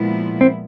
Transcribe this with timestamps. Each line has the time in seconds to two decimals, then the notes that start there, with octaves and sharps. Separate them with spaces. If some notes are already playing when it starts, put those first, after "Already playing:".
Already playing: A#2 F3 G#3 B3 E4
0.41 C4